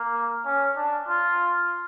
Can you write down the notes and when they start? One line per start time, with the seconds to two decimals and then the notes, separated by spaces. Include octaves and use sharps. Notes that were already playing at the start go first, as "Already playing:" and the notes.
Already playing: A#3
0.45 C#4
0.76 D4
1.08 F4